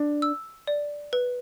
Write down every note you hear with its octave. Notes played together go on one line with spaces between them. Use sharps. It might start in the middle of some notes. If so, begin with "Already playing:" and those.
Already playing: D4
E6
D5
B4